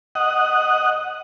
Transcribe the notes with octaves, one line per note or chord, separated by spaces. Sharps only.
D#5 F#5